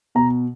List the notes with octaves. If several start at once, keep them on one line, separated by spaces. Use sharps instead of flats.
B2 A#5